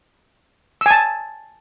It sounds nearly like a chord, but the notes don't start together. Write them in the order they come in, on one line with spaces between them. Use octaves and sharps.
E6 G#5 A5